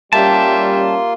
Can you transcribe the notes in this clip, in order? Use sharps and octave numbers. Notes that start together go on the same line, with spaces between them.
G3 A#3 C#4 F4 G4 E5 A5 C6